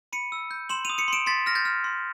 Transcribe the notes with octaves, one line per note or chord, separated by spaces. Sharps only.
B5 C#7 D#7
E6
G6
C6 E7 F#7
D#7 F7
D#6
C#7 D#7
C6 D7 E7
C6 A6 B6
F6 A#6
G6 A6
F6
C6